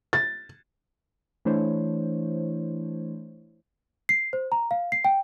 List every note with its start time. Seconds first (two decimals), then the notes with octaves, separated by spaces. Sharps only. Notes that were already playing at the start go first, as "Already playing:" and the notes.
0.13 A6
1.45 E3 A3 D4 E4 C5 C#5
4.09 C7
4.33 C5
4.52 A#5
4.71 F5
4.92 C7
5.05 G5